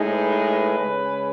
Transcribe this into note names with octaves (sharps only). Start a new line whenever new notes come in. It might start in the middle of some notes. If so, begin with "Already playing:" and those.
Already playing: A2 G#3 D#4
B4
C#3 G#3 C#4